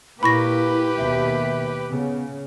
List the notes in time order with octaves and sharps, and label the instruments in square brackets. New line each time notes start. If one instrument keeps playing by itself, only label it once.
[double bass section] A#2 A#3 [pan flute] E4 [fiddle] G4 B4 [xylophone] B5 C#6 A#6
[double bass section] D#2 B2 [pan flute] E5
[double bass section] C#3 [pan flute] B3